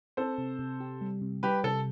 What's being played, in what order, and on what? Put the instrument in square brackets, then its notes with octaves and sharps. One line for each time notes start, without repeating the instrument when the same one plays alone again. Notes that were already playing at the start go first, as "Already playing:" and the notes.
[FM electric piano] C4 [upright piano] A4 C5
[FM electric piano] C3
C3
G4
G3
C3
[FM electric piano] G3 [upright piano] G4 B4
[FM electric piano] C3 [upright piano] A4